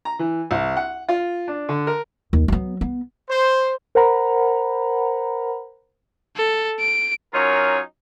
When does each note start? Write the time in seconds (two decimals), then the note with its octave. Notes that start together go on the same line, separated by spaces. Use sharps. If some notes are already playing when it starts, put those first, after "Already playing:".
0.05 A#5
0.19 E3
0.51 C2
0.77 F#5
1.08 F4
1.48 D4
1.69 D3
1.87 A#4
2.33 D#2
2.48 F#3 B3
2.81 B3
3.30 C5
3.95 A#4 C5 F#5 A#5 B5
6.37 A4
6.80 D7
7.34 F#3 C#4 D#4 F4 A#4 C#5